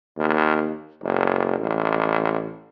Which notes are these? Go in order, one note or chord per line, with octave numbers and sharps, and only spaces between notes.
D#2
F#1
A1